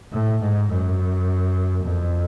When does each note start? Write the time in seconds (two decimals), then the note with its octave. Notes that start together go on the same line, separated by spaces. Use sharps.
0.12 A2
0.41 G#2
0.70 F#2
1.85 F2